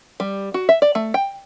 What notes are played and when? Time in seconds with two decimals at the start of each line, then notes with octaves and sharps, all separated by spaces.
0.20 G3
0.54 F#4
0.69 E5
0.82 D5
0.95 A3
1.14 G5